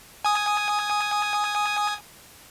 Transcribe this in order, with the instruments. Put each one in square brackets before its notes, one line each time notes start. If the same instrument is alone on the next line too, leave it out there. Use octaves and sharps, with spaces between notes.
[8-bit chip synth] G#5 D#6